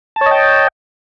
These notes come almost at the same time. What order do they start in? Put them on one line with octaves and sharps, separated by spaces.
A5 C#5 D#5 G5